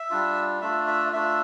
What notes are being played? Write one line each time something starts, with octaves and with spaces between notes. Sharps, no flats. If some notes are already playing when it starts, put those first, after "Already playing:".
Already playing: E5
G3 D4 F4
A3 D4 F4 E5
E5
A3 D4 F4 E5